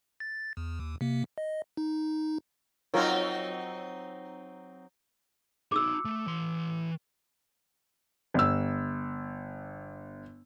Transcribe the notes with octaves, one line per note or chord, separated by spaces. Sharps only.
A6
E2
D#2
C3 A#3
D#5
D#4
F#3 C4 D#4 F4 A#4 C#5
D#4 F#4 D6 E6
A3
E3 C6
G1 E6